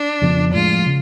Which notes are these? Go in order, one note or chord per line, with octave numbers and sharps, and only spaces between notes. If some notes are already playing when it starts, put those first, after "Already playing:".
Already playing: D4
F2 C#3 F3 B3
A2 F3 G#3 F4
C#3